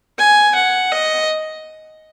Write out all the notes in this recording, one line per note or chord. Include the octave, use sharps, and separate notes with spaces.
G#5
F#5
D#5